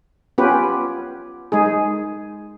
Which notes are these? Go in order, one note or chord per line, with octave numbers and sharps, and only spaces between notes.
B3 C#4 F4 G4 B4
G#3 D#4 G#4